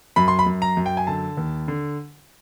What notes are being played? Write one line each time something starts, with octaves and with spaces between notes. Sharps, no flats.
F#2 B5
C6
B5
F#2
A#5
F#2
G5
G#5
D3 A5
D#2
D3